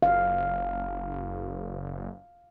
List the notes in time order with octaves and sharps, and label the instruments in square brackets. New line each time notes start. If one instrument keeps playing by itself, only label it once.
[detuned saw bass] F#1 [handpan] F5